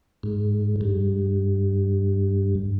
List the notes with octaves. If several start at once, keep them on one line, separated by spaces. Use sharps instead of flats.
G#2
G2